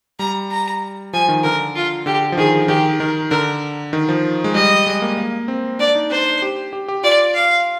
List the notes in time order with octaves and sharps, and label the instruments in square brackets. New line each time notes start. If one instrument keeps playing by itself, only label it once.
[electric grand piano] G3 [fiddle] A#5
[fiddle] A#5
[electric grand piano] F3 [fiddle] G#5
[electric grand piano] D#3
[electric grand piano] D3 [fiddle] A#4
[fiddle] F4
[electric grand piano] D3 [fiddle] G4
[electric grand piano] F3
[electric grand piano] D#3 [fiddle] G#4
[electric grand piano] D#3 [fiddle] G4
[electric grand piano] D#3 [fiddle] A#4
[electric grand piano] D3 [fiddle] A#4
[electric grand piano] D#3
F3
G#3
[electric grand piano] G3 [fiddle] D#5
[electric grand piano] G#3
A#3
A#3
C4
[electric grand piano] D4 [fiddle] D5
[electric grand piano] D#4
[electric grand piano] D4 [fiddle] C5
[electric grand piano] G4
G4
G4
[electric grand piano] F4 [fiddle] D5
[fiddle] F5